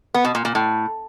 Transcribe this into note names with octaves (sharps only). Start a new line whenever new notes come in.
B3
B2
A#2
A#2
A2